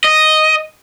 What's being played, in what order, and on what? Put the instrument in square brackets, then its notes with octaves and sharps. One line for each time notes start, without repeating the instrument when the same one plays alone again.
[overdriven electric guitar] D#5